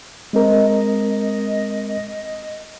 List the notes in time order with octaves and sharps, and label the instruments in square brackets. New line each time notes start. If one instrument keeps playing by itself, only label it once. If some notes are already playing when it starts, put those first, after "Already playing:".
[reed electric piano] G#3 C4 A#4 [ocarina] D#5
[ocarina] D#5